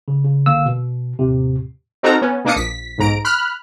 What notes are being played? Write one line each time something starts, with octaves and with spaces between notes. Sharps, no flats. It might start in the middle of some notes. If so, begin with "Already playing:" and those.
C#3
C#3
A1 D3 A#3 F5 E6
B2
D#2 A2 C3
C4 D#4 F#4 A4 A#4 A#5
B3 C#4
B2 A#3 D4 D6 D#6 C#7
A#1 B6
B1 G#2 A#5 D7
B5 F6 F#6